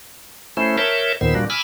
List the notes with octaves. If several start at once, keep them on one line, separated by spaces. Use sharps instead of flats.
A3 C#4 E4 C5
A#4 C#5 E5 A5 G6
D#2 A#2 D#3 B3 C5 E6
A#2 G3 A#3 D4 F#4
G#5 B5 D6 E6 F6